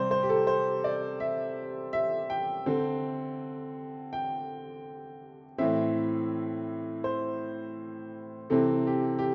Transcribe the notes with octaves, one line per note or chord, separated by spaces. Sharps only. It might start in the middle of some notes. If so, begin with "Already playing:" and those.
Already playing: C3 G3 C4 C5
C5
G4
A4
C5
D5
E5
E5
G5
D3 C4
G5
A2 E3 C4 E5
C5
C3 E3 C4 A4
G4
G4